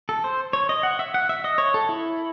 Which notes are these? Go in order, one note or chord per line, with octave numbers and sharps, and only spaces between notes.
A4
C5
C#5
D#5
F#5
E5
F#5
E5
D#5
C#5
A4
E4